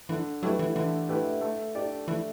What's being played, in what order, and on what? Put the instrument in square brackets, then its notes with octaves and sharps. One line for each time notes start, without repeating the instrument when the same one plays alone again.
[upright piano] D3 [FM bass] E3
[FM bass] F#3 [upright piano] A3 E4 G4 B4
[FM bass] E3
[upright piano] D3 [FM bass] E3
[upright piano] A3 E4 G4 B4
A3
D4 G4 D5
[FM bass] E3 [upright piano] A3